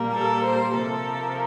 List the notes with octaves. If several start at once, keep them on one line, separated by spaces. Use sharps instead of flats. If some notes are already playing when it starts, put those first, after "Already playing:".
Already playing: A#2 G3 A#3
A4
C5
C3 F3 A#3 A4